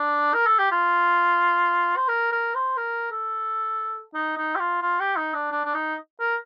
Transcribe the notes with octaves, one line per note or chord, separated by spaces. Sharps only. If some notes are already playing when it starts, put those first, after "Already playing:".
Already playing: D4
A#4
A4
G4
F4
C5
A#4
A#4
C5
A#4
A4
D#4
D#4
G4
F4
F4
G4
D#4
D4
D4
D4
D#4
A#4